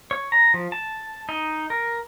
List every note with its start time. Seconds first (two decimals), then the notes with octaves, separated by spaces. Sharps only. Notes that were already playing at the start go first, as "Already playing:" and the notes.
0.11 C#5
0.32 A#5
0.54 F3
0.72 A5
1.29 D#4
1.70 A#4